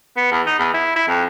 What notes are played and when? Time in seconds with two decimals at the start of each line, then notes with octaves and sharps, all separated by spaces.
0.17 B3
0.32 E2
0.47 D#4
0.59 E2
0.74 E4
0.96 E4
1.08 F2